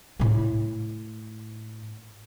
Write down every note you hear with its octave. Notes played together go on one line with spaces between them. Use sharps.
A2 E4